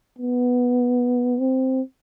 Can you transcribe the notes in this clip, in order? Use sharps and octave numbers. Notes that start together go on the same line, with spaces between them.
B3
C4